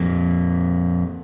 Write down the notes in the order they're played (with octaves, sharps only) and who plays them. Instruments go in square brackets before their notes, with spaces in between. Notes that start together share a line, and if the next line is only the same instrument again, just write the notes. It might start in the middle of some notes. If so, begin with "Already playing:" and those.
Already playing: [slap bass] F2 A#2